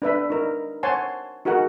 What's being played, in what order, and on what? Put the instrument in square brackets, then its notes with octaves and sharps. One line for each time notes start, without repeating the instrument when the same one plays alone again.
[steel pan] D4 B4 E5 B5
D#4 A#4
C5 C#5 F#5 G#5 A5 C6
D#4 F#4 G#4 A#4 F#5